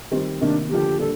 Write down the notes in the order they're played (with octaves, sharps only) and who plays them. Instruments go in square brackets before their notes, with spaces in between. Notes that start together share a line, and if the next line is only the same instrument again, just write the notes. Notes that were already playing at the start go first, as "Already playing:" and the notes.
[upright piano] D#3 G3 C4
[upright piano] C3 D#3 A#3 [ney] D4
[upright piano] D3 F3 A#3 [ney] G4
[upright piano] A#2 G3 D4 [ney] A4